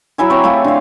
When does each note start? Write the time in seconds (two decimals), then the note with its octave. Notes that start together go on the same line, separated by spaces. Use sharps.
0.18 F#3 E4 E5 G#5
0.30 C4 C#5 A#5 D6
0.44 A3 F4 G#4 D#5
0.64 D3 F5